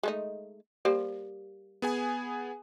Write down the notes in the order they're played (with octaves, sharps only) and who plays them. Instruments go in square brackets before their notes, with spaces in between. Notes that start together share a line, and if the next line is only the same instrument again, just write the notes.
[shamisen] G#3 A3 D#4
[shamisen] G3 A#3 C5 [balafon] G4
[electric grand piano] B3 G#4 G#5